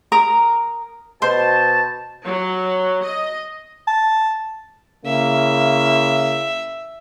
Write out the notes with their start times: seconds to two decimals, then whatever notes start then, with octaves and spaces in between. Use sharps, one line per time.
0.12 A#4 A#5 D#6
1.22 B2 C5 A5
2.24 F#3
3.02 D#5
3.88 A5
5.06 C#3 A#3 E4 E5